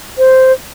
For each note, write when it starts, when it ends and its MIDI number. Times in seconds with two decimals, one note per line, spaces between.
0.18 0.52 72